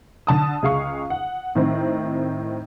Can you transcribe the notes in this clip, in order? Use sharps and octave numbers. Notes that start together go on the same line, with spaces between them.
D3 A5 D#6
C#2 G#4 F5 C#6
F#5
A2 D#3 C4